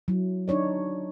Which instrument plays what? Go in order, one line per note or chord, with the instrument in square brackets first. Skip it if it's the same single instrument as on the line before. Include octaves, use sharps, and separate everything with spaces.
[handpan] F#3 E4
D4 D#4 C#5 D5